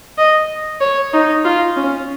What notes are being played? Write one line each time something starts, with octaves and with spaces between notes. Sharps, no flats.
D#5
C#5
D#4
F4
C#4